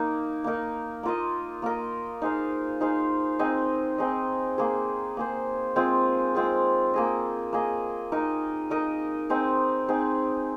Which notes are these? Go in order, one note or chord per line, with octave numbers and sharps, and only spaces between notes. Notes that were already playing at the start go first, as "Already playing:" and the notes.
Already playing: A#3 D#4 A#4
A#3 D#4 A#4
A#3 F4 A#4 D#5
A#3 F4 A#4 D#5
D#4 G#4 C5 F5
D#4 G#4 C5 F5
C4 D#4 G#4 D#5
C4 D#4 G#4 D#5
A#3 G#4 C5
A#3 G#4 C5
G#3 C4 F4 G#4
G#3 C4 F4 G#4
A#3 G#4 D#5
A#3 G#4 D#5
D#4 A#4 D#5
D#4 A#4 D#5
C4 D#4 G#4
C4 D#4 G#4